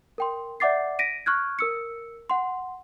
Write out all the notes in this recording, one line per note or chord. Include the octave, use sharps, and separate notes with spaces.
A#4 G5 C6
D5 E5 F#5 D6 A6 C7
A#6 B6 D7 D#7
C#6 F6 F#6 G#6
A#4 E6 C#7
F#5 C6